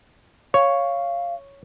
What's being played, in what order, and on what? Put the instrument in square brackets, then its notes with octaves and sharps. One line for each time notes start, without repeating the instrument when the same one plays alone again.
[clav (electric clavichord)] C#5 [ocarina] F5